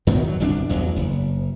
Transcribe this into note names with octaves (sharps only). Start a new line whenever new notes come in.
F#2 B2 D#3 F#3
F#3
G1 C2 C#4 D4
A1 E2 F#3
F#1